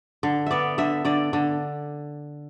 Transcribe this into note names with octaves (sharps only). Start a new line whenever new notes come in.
D3
B3 D5 E5
D3 E5
D3 D5
D3